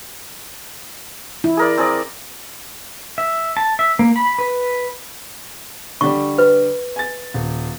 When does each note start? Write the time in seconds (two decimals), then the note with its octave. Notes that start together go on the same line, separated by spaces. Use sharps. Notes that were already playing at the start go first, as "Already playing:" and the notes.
1.44 E4
1.57 G#4 A#4 D5
1.77 C4 G#4 D5
3.18 E5
3.57 A5
3.79 E5
3.99 A#3
4.16 B5
4.39 B4
6.01 D3 G3 C#6
6.38 B4
6.96 G#5 A6
7.34 D#1